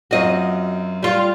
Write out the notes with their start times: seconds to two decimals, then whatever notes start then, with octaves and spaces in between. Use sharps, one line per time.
0.11 F#2 C4 F4 F#4 D#5
1.03 G3 F4